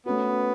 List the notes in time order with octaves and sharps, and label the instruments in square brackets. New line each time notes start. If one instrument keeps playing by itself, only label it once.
[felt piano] A3 C#4 F#4 [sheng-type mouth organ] B3